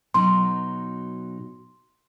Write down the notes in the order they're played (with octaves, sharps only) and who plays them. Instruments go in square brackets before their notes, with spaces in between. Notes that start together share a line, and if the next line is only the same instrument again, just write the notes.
[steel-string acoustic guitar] B2 F#3 D#4 [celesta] C6